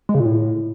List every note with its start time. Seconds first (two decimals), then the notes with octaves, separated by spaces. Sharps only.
0.09 G#3
0.14 C#3
0.20 A#2
0.25 A2